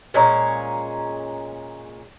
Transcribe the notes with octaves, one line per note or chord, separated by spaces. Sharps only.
A#2 G#3 C#4 A#5